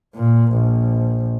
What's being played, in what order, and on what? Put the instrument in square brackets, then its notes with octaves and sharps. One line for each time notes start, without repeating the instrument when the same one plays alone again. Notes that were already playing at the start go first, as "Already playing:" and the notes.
[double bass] A#2
A#1